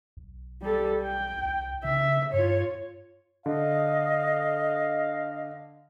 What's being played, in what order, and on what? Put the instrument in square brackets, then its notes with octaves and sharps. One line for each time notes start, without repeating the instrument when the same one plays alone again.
[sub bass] B1
[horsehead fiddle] G3 A4
G5
[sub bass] C2
[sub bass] C#3 [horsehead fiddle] E5
[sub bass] G2 [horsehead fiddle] F4 C#5
[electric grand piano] D3 [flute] D#5 [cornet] F5